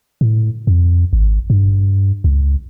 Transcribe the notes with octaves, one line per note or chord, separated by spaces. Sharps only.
A2
F2
G#1
G2
C#2